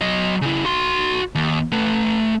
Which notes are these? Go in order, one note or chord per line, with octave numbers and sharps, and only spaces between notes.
F#3 D#5
C#3 E4
F#4 C6
D#2
A3 B4